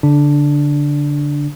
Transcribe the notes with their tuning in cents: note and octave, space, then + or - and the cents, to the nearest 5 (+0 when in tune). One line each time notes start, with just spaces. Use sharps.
D3 -30 D4 +0